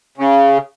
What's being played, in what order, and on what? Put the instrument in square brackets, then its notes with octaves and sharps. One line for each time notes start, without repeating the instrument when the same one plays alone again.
[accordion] C#3